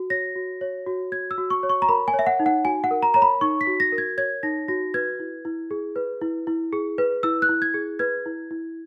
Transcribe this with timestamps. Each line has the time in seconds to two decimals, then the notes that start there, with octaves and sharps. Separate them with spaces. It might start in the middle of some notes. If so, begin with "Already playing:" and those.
Already playing: F#4
0.10 C#5 A#6
0.36 F#4
0.61 C#5
0.87 F#4
1.12 C#5 G#6
1.31 E6
1.38 F#4
1.50 C#6
1.63 C#5
1.69 C#6
1.82 A#5
1.89 A#4 B5
2.08 G#5
2.14 C#5
2.19 E5
2.27 F#5
2.40 D#4
2.46 F#5
2.65 F#4 G#5
2.84 F#5
2.91 A#4
3.03 A#5
3.14 C#5 A#5
3.22 B5
3.41 D#4 C#6
3.61 B6
3.67 F#4
3.80 A#6
3.92 A#4
3.98 G#6
4.18 C#5 G#6
4.43 D#4 A#6
4.68 F#4 A#6
4.94 B4 G#6
5.19 E4
5.45 E4
5.71 G#4
5.96 B4
6.21 E4
6.47 E4
6.73 G#4
6.98 B4
7.23 E4 E6
7.42 F#6
7.49 E4
7.62 G#6
7.74 G#4
7.99 B4 G#6
8.26 E4
8.51 E4